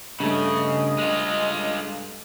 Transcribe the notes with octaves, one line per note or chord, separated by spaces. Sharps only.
G2 C#3 A3 D#5
G#3 F4